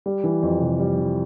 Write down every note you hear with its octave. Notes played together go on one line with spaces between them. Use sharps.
G3
E3
F2
C3
G3
E3